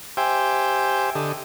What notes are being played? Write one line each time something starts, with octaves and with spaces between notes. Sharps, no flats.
G4 C5 E5 G5 G#5
D3 G4 A4 D#5